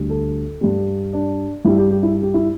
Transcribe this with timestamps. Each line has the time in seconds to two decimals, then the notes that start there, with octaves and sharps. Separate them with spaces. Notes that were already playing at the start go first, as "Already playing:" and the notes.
Already playing: D2 D3 G3
0.10 A4
0.61 G2 G3
1.13 D4
1.65 G2 G3 E4
1.78 G4
1.91 G4
2.03 E4
2.22 G4
2.34 E4